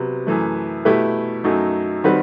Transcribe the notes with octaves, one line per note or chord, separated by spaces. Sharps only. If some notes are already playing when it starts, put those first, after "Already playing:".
Already playing: C3 F#3 B3
F#2 E3 A3
B2 A3 E4 G4 B4
F#2 F#3 A3 D#4
D#3 G3 C4 F#4 B4